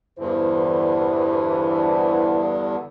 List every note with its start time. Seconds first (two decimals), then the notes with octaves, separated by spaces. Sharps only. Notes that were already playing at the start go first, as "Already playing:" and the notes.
0.19 E2 G2 D3 E3 C5